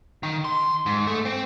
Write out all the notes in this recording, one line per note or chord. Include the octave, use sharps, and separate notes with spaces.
D#3
C6
G#2
A3
C4